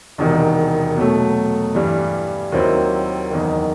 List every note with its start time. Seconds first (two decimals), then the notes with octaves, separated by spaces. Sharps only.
0.18 E1 E2 C3 D#3
0.96 B2 F#3 A3
1.75 G2 E3 G3
2.52 D#2 D#3 F#3 C4 E4
3.30 F#1 E2 D#3